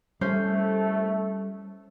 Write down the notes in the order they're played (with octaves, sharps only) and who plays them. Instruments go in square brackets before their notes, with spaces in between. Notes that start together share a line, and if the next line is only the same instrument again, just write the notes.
[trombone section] C2 A3 [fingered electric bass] G3 [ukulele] C#4 C5